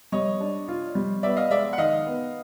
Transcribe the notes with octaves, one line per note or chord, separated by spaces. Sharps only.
G3 C#5 D#5
D4
F4
G3
B3 D5 E5
D#5 F5
G#3 D5 E5
F#5
D#3 D#5 F5
B3